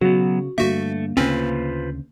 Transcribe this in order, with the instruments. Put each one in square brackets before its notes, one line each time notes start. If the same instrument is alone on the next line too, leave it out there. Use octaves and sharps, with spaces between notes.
[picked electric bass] C#3 [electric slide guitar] F#3 B3 [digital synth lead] F#4
[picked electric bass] G2 D3 [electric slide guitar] A3 [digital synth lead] A#3 [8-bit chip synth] F#4 E5
[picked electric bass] D2 C#3 [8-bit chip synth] C4 C#4 [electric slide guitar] F4 B4 C5